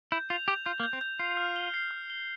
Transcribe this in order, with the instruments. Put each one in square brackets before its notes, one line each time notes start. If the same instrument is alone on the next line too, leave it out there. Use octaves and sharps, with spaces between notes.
[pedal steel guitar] E4 [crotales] G6
[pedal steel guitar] F4 [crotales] F7
[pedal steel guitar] G4 [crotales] G6
[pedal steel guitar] F4 [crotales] G6
[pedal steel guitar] A#3
[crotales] G6
[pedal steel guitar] C4
[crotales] G6
[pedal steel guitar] F4 [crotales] C7
[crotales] F6
G7
C7
F6
G7